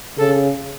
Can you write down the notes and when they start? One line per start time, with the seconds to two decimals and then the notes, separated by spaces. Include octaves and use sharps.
0.17 C#3 A4